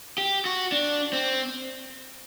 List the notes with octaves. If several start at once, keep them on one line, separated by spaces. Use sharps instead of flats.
G4
F#4
D4
C4